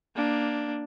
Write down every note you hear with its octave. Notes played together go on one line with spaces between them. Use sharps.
A#3 D4